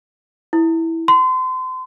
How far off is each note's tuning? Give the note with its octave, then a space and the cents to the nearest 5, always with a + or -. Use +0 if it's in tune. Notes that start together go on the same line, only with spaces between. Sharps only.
E4 -5
C6 -30